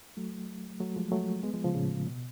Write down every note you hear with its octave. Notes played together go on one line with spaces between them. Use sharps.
F#3 A3
F#3 A3
F3 G#3
F#3 A3
G#3 B3
F3 G#3
C#3 F3
A2 C#3
B2